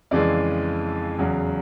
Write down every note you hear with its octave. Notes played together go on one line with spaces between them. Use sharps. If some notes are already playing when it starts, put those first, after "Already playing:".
F2 C#3 E3 G#3 D5
E2 C#3 F#3